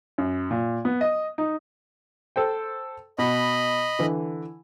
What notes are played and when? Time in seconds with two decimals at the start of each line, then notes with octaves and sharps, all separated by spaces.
0.18 F#2
0.51 A#2
0.85 B3
1.01 D#5
1.38 D#4
2.36 A4 C5 G5
3.19 B2 D#5 B5
3.99 D3 E3